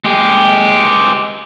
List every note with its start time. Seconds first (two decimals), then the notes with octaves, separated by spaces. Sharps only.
0.04 G#3 G4